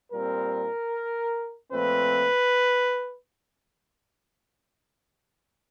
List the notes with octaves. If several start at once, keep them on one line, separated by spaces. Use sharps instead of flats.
A#2 G3 C4 A#4
A#2 F3 A3 C4 B4